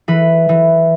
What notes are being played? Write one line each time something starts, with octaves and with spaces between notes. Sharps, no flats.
E3 B4
E3